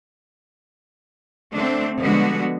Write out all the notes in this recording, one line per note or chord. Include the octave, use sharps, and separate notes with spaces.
D3 A3 C4 D4
D3 F3 G3 G#3 B3 F#4